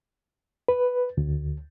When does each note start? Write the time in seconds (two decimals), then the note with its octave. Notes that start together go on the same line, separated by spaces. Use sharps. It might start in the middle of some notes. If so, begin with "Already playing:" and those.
0.68 B4
1.17 D2